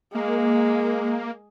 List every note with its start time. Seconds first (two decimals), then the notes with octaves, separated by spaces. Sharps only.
0.15 G#3 A#3